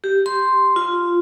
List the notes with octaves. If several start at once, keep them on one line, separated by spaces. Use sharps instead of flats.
G4
C6
F4